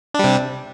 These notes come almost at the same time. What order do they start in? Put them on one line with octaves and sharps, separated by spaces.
D4 G3 C3